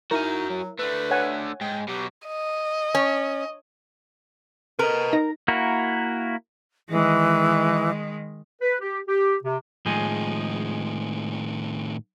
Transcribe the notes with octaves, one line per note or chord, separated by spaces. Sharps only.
D#4 E4 F#4 A#4 G#5
F#3
D3 A3 B4
C#5 F#5 G#5
G#2 G5
B2 F#3 G4
D#5
C#4
A#4 B4 D#5
D#4 A#6
A#3 E4 F#4 A#4
D#3 E3 G#3
B4
G4
G4
C3
A2 D#3 F3 G#3 G#4